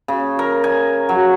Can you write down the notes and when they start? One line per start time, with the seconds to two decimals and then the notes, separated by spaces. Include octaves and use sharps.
0.08 C#3
0.39 A#4
0.64 G#5
1.09 F#3